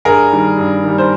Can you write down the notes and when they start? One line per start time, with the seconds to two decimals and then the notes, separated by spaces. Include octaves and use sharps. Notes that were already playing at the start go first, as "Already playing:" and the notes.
0.05 G2 G#4 A#4
0.32 D#3 G3
0.58 G2
0.84 D#3 G3
0.98 C5